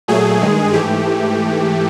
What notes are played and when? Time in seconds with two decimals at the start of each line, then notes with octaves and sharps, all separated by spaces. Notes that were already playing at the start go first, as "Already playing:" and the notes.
0.08 A#2 F#3 A3 G#4
0.41 G2 D#3 G#3
0.73 G#2 E3 A3 G4